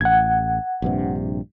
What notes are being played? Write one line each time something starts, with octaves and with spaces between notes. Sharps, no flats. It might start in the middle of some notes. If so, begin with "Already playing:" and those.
A1 F#5 G#6
A#1 G2 C3